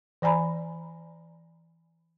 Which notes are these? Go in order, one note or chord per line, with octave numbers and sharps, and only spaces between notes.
E3 D5 G#5 A#5 B5